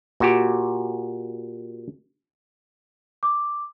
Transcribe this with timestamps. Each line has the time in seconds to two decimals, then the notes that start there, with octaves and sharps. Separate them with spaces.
0.20 A#2 F#4 G4
3.23 D6